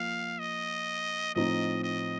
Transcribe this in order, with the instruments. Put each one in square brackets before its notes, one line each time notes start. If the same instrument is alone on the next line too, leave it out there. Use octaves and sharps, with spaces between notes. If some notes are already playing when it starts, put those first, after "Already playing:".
Already playing: [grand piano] F3 A#3 [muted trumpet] F5
[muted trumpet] D#5
[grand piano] A2 F3 C4 D#4 [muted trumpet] D#5
[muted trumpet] D#5